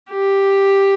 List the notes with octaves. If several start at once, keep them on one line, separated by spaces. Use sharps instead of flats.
G4